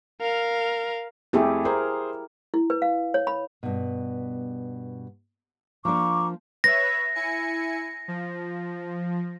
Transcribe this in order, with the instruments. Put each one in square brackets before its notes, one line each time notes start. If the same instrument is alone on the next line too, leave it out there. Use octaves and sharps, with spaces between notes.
[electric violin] A#4 F5
[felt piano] F2 A3 [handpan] E4 G4 G#4
[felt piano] G#4 C5 [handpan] A#4
[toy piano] E4
B4
F5
C#5
B5
[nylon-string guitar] G2 B2
[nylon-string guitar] F3 A#3 D4 [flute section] A#5 C#6 D6
[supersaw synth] B4 C#5 E5 [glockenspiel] A#6
[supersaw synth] E4 G#5 C#7
F3